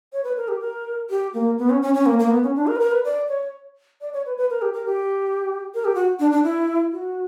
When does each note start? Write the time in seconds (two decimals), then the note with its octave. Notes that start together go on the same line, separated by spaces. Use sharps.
0.13 C#5
0.24 B4
0.37 A#4
0.48 G4
0.61 A#4
1.10 G4
1.34 A#3
1.58 B3
1.70 C#4
1.82 C#4
1.94 C#4
2.06 A#3
2.19 A#3
2.31 B3
2.43 C#4
2.56 D4
2.67 A#4
2.76 B4
2.80 A#4
2.92 B4
3.04 D5
3.28 C#5
4.01 D5
4.13 C#5
4.26 B4
4.37 B4
4.50 A#4
4.62 G4
4.73 A#4
4.86 G4
5.74 A#4
5.85 G4
5.95 F#4
6.20 D4
6.31 D4
6.44 E4
6.92 F#4